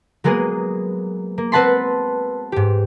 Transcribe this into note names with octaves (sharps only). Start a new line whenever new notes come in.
F#3 G#3 A#3 B3 G#4
A#3
C4 B4 F#5 A5 B5 C6
G#2 G4